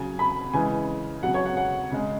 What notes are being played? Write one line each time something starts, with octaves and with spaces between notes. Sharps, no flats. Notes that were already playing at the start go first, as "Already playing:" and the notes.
Already playing: C#3 F#3 G#5
B5
C#3 E3 G#3 G#5
C#3 F#3 F#5
C#5
F#5
F#5
C#3 G#3